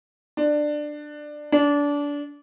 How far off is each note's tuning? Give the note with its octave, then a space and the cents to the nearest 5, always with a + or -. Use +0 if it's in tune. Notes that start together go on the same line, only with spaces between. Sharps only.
D4 +15
D4 -25